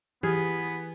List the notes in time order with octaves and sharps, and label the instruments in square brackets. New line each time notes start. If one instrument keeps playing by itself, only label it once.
[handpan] E3 [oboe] B3 [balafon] G4 [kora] G#4